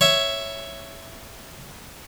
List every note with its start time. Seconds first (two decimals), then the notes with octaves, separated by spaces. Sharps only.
0.01 C#5 E5